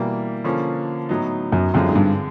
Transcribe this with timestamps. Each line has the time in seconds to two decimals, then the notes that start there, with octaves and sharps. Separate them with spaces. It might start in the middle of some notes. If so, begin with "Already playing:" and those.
Already playing: B2 E3 G3 A#3
0.44 D3 F3 A#3 C#4
1.09 A2 F#3 B3 D#4
1.52 F#2
1.74 F#2 D3 F3 G#3 C4 F4
1.89 G#2
1.95 G2